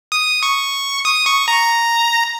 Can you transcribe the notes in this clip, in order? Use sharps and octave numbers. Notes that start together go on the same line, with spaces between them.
D#6
C#6
D#6
C#6
A#5